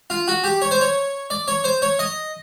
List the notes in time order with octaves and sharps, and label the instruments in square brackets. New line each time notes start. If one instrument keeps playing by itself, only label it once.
[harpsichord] F4
F#4
G4
C#5
C5
C#5
D5
C#5
C5
C#5
D#5